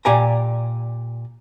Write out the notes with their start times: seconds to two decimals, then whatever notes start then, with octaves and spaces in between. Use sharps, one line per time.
0.05 A#2 G4 D5 G#5 A#5